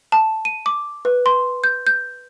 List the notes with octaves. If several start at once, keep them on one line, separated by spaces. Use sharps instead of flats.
A5
D#7
D6
B4
C6
G6
G6